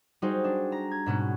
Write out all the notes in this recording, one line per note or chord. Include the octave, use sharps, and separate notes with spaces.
G3 D#4 F#4 G#4 C5
D4
A#5
G#6
G#2 B2 C#4 F#4